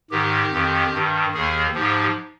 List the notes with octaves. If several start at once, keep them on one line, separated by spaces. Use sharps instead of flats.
G#2 D#3 G4
F2 D#3
G2 D#3
D#2 D#3 G#4
G#2 F3 G4